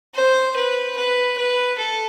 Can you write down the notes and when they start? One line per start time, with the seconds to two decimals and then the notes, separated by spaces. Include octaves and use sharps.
0.15 C5
0.56 B4
0.97 B4
1.37 B4
1.78 A4